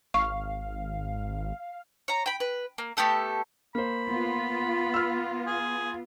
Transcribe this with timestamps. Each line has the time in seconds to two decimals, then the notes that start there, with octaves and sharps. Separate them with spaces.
0.14 G#1 F5 C#6
2.08 C#5 A#5
2.26 G5 B5
2.40 B4
2.78 A#3
2.97 A3 B3 G4 A4
3.75 A#3 C5 B5
4.09 B3 F4
4.94 E6 F6
5.47 G#4